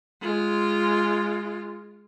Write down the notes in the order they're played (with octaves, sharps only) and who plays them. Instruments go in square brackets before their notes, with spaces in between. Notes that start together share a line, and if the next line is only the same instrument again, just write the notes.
[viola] G#3 F4